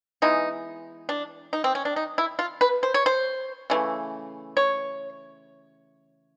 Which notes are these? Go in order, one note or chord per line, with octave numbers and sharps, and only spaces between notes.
E3 G#3 B3 D#4
D4
D#4
C4
C#4
D4
D#4
E4
F4
B4
C5
C#5
C5
C#3 E3 A3
C#5